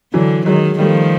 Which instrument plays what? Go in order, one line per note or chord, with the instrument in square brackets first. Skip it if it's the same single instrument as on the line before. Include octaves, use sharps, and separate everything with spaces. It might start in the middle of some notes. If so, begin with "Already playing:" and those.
[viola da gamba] D3 [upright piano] E3 F#3
[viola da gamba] D#3 [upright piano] F#3 G#3
[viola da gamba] D#3 F3 [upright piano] G3 A3